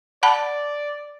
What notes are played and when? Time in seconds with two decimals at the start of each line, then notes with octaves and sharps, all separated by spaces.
0.23 D5 F#5 A5 B5